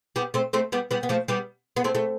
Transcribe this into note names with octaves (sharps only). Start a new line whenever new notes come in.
G3 B3
A3 C4
A3 C4
G3 B3
G3 B3
B3
F3 A3
G3 B3
B3
A3 C4
A3